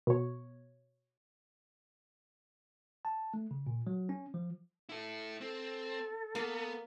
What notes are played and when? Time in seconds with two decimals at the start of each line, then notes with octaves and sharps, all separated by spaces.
0.07 B2 C#5
3.05 A5
3.34 A3
3.51 C#3
3.67 A#2
3.87 F#3
4.09 C#4
4.34 F3
4.89 E4 A4
5.41 C4 A4
6.35 A#3 B3